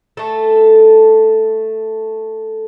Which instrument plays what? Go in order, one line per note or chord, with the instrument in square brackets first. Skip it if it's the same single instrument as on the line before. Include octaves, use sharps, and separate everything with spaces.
[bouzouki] A3 A4